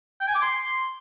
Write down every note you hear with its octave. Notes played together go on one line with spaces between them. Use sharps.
G5
G#5
D6
C6